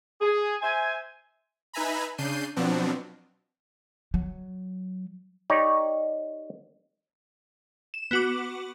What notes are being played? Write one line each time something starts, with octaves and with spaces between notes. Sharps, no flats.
G#4
C5 E5 G#5
D#4 B4 E5 G#5 A#5 B5
C#3 D4 G6 C7 D#7
B2 F3 F#3 B3 C4 D4
F#3
D#4 G4 C#5 D5
E7
B3 F#4 D6